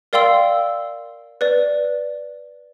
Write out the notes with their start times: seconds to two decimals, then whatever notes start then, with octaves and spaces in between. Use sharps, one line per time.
0.13 A#4 D5 F5 G5 C6 E6
1.41 B4 D5